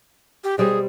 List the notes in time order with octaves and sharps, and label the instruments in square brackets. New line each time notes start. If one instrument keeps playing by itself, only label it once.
[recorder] G4
[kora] B2 G3 C4 [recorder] G#4